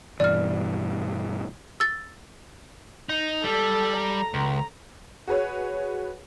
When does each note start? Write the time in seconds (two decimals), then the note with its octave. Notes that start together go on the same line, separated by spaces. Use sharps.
0.20 G2 B2 E3 D5 F6
1.80 E6 A6
3.09 D#4
3.44 G3 A4
3.97 A#5
4.34 C#2
5.27 F#4 G#4 B4 C#5